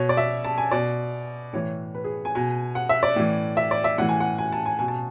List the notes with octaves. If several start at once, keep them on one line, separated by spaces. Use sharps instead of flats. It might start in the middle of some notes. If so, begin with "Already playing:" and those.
Already playing: B2 C#5
D5
E5
A5
G#5
B2 D5
A2 E3 C#5
B4
G#4
G#5
B2 G#5
F#5
E5
D5
A2 E3
E5
D5
E5
A2 E3 F#5
G#5
F#5
G#5
A5
G#5
B2 G#5
A5